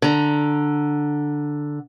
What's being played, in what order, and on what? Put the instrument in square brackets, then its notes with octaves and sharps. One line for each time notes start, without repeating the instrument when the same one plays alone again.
[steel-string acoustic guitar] D3 A#5